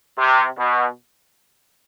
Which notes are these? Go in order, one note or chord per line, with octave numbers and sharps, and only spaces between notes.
C3
B2